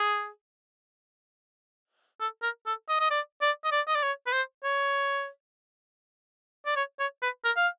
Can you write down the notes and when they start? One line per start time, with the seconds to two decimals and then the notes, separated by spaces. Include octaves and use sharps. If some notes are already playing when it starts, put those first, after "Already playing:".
Already playing: G#4
2.20 A4
2.43 A#4
2.66 A4
2.89 D#5
3.00 D#5
3.11 D5
3.42 D5
3.65 D#5
3.72 D5
3.88 D#5
3.95 D5
4.03 C#5
4.27 B4
4.33 C5
4.64 C#5
6.66 D5
6.76 C#5
6.99 C#5
7.22 B4
7.45 A#4
7.56 F5